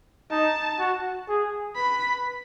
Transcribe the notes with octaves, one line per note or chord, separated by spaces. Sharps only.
D#4 A5
F#4
G#4
B4 B5